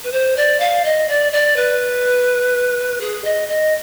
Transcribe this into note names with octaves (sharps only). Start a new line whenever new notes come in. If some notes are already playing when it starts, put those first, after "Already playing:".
B4
C5
D5
F5
D#5
D5
D5
B4
G#4
D#5
D#5